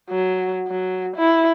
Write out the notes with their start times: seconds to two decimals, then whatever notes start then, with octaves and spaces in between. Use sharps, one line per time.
0.10 F#3
0.67 F#3
1.17 E4